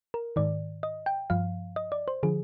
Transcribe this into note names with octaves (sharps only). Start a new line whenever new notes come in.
A#4
G#2 D#3 D5
D#5
G5
G2 F3 F5
D#5
D5
C5
D3 F3 G#4